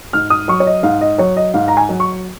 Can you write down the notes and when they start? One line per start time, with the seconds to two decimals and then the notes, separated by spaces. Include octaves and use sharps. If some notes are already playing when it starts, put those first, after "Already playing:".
0.13 G#2 F6
0.30 D#6
0.48 F#3 C#6
0.60 C#5
0.67 D#5
0.83 G#2 F5
1.01 D#5
1.18 F#3 C#5
1.37 D#5
1.54 G#2 F5
1.68 A#5
1.77 G#5
1.89 F#3
2.00 C#6